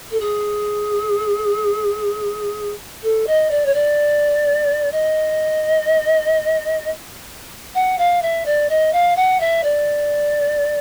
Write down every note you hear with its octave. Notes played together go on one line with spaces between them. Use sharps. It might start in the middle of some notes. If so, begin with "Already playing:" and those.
A4
G#4
A4
D#5
D5
C#5
D5
D#5
F#5
F5
E5
D5
D#5
F5
F#5
E5
D5